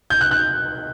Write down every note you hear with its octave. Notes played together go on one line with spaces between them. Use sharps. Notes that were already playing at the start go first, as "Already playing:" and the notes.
G6
F#6
F#6